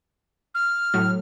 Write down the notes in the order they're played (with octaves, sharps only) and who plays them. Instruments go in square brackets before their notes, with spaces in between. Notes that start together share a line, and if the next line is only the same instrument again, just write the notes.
[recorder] F6
[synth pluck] A2 F#3